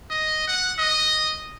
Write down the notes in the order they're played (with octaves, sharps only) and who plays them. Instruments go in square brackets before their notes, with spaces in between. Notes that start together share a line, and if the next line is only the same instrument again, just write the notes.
[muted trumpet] D#5
F#5
D#5